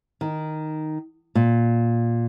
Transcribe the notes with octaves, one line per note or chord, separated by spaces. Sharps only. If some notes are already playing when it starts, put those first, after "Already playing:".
D#3
A#2